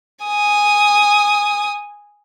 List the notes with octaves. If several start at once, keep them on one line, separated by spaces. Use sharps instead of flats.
G#5 D#6